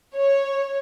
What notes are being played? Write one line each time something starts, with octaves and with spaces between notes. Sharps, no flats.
C#5